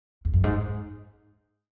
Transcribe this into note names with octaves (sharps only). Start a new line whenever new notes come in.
E2
F#2
G#2